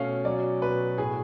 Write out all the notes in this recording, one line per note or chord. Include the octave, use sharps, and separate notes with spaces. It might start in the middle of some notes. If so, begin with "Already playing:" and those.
Already playing: B2 A3 C#4 F5
F#3 D5
B2 B4
A2 G#4